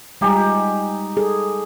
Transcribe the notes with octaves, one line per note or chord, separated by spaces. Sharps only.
G3 G#3 D#4 G4 G#5
G#4 A4